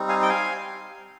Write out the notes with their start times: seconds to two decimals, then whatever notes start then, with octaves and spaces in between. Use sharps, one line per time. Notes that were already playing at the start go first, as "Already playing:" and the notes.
Already playing: G3 C4 D#4
0.09 F5 G#5
0.23 G5
0.29 F5 G#5